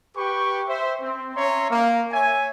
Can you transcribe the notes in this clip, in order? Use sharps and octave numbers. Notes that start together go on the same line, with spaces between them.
G4 B4 G5 C#6
C5 E5
C4
C#4 C#5 E5 A#5 C6
A#3
C#5 E5 G#5